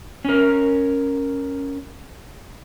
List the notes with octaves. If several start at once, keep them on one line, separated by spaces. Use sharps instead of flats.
C#4 A#4